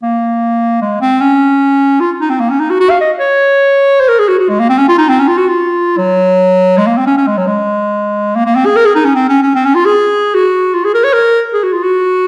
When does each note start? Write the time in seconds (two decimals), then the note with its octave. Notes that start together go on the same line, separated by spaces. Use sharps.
0.03 A#3
0.81 G#3
1.01 C4
1.21 C#4
2.00 F4
2.21 D#4
2.30 C4
2.40 A#3
2.50 C#4
2.60 D#4
2.70 F#4
2.80 F#4
2.90 F5
3.01 D#5
3.19 C#5
4.00 C5
4.09 A#4
4.19 G#4
4.28 F#4
4.39 F#4
4.49 G#3
4.59 A#3
4.69 C4
4.78 C#4
4.88 F4
4.98 D#4
5.09 C4
5.19 C#4
5.28 F4
5.38 F#4
5.48 F4
5.98 F#3
6.78 G#3
6.87 A#3
6.98 C4
7.06 C#4
7.17 C#4
7.27 G#3
7.37 F#3
7.47 G#3
8.35 A#3
8.46 A#3
8.55 C4
8.66 G#4
8.76 A#4
8.86 G#4
8.95 D#4
9.05 C#4
9.15 C4
9.29 C#4
9.42 C#4
9.55 C4
9.65 C#4
9.75 F4
9.85 G#4
10.35 F#4
10.74 F4
10.85 G#4
10.94 A#4
11.04 C#5
11.13 A#4
11.53 G#4
11.63 F#4
11.73 F4
11.83 F#4